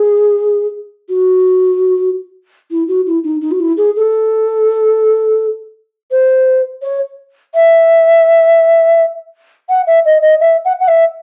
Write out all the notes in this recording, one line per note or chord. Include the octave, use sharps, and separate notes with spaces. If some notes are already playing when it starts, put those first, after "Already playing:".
Already playing: G#4
F#4
E4
F#4
E4
D#4
D#4
F#4
E4
G#4
A4
C5
C#5
E5
F#5
E5
D#5
D#5
E5
F#5
F#5
E5